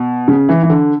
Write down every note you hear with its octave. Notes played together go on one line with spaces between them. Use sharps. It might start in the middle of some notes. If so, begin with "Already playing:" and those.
Already playing: B2
C#3
E3
E3
D3